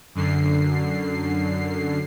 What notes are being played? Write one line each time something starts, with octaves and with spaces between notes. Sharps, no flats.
F#2 D3 C7